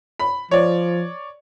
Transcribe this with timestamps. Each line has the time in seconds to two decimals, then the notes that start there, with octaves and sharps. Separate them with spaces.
0.20 B5
0.51 F3 C#5 D5